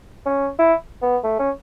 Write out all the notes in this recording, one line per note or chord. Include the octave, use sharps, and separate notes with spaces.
C#4
E4
B3
A3
C#4